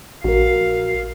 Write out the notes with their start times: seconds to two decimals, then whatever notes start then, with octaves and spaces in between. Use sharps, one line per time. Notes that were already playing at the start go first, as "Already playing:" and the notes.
0.24 A#1 F#4 A#4 F5